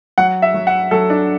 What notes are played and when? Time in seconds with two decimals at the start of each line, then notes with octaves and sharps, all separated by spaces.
0.18 F#3 F#5
0.42 E5
0.54 F#3
0.67 F#5
0.91 F#3 A4
1.10 D4